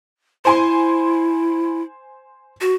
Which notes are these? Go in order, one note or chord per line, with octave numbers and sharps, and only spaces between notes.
E4 C5 G#5 C6
F#4